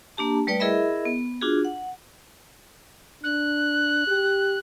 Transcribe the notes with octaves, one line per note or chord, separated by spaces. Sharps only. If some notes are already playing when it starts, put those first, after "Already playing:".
A#3 D4 G4 A5
G3 A3 B4 D5 G5
E4 G#4 A#4 D#5 E5 B5
B3
D4 F4 F#4 G#4
F#5
D4 F#6
G4